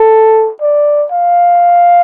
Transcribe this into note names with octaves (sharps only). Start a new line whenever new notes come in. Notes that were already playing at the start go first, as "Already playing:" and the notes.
Already playing: A4
D5
F5